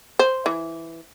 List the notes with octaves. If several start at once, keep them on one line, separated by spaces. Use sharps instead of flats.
C5
E3